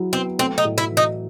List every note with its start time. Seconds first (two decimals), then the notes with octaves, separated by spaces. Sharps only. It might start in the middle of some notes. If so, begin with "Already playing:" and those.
Already playing: F#3 E4
0.13 B3 C4
0.39 A3 C4
0.58 D#4
0.65 A2
0.78 E4
0.91 E3
0.97 D#4